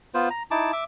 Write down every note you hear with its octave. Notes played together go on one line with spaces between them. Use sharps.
B3 F4 C5
A#5
D#4 E4 A5 D6
E5 D6